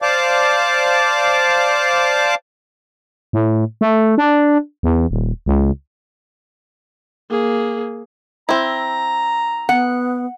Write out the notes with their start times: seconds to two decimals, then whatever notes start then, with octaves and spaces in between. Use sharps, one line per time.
0.02 C5 D5 F5 A5 D6
3.33 A2
3.81 A3
4.18 D4
4.83 E2
5.11 D#1
5.46 C#2
7.31 A#3 G#4
8.49 C4 E4 A#5
9.69 B3 F#5